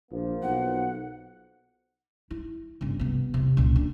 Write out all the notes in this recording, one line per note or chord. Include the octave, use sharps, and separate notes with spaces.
A#1 F3 A#3
B1 F#5
E4
G1 C#3
C3 B3
E2 C3
C#2 A#2
D3